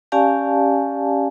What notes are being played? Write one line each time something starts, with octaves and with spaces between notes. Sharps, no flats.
C#4 G4 D5 F5 G#5 A5